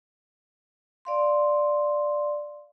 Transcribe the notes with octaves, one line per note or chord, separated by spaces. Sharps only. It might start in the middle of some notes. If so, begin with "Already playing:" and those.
D5 F5 C6